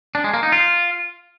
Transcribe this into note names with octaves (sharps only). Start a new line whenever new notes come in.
D4
G#3
A#3
D#4
F4